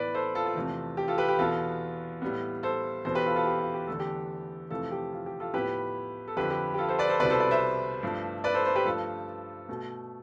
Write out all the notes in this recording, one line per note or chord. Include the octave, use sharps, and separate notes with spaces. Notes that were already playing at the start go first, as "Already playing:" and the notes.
Already playing: A2 E3 B3 B4 D5
A4 C5
F4 A4
F4
E2 C3 F3 A3
G4
F4 A4
G4 B4
G4
E2 B2 B3 F4 A4
A2 G3 B3
A4 C5
E2 B2 B3 A4 C5
G4 B4
F4 A4
F4 A4
G4
F4
G4
E2 D3 A3 A4
G4
F2 C3 E3 A3 F4 A4
G4
F4
G4
F4 A4
A2 F3 B3 G4 B4
A4
F2 D3 F3 G4 B4
G4
G4
F4 A4
A4 C5
B4 D5
A4 C5
C2 B2 G3 B3 B4 D5
A4 C5
B4 D5
C5 E5
G2 F3 A3
B4 D5
A4 C5
A4 C5
G4 B4
G2 F3 A3 F4 A4
B2 A3